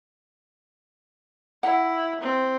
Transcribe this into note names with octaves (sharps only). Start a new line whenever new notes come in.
E4 F#5
C4